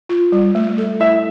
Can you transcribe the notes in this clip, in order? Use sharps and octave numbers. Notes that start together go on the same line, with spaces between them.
F4
G3
A3
A4
E4 E5